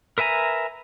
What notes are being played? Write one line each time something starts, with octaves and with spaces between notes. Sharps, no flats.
A#4 B4 E5 G#5 A#5